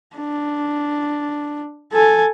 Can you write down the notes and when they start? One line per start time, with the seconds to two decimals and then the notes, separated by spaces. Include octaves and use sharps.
0.16 D4
1.93 A4 G#5